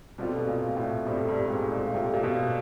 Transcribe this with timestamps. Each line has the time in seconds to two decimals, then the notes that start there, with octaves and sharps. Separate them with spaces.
0.18 B2 G3 C4 F4 A4
0.38 B2
0.47 A#2
0.68 A#2
0.77 A2
1.06 G2 G3 C4 F4 A4
1.28 G2
1.45 G2
1.50 G#2
1.72 A#2
1.94 C3 G3 C4 F4 A4
2.14 A#2
2.23 B2